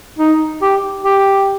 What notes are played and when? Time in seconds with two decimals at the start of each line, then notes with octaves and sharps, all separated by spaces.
0.19 D#4
0.62 G4
1.05 G4